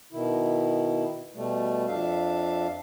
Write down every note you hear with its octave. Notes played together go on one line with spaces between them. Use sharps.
B2 D#3 E4
B2 G3 A3
F2 D4 E5 F5